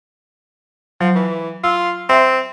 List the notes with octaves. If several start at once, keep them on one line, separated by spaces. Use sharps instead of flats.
F3 F#3
E3
F4 E6
C4 E5